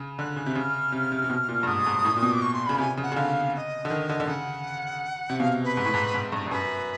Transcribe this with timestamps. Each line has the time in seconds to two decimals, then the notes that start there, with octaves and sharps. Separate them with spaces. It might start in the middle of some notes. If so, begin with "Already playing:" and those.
Already playing: C#3
0.18 D3 F#6
0.36 C#3
0.46 C3
0.55 C#3 F#6
0.60 F6
0.92 C3
1.12 C3
1.24 C3
1.30 B2
1.48 A#2
1.63 G2
1.67 G#2 D#6
1.86 G#2
2.05 A2
2.17 A#2
2.23 B2
2.33 D6
2.41 C#6
2.53 C6
2.66 C#3 B5
2.78 C3 G#5
2.97 C#3
3.03 F#5
3.12 C#3
3.16 D3 F5
3.53 F5
3.56 D#5
3.85 D3
3.90 D#3
4.09 D3
4.20 D3
4.27 C#3 F#5
5.30 C3
5.40 B2 F5
5.64 B4
5.77 G#2
5.85 A2
5.94 G#2
6.14 G#2
6.32 G2
6.46 G2
6.51 F#2 B4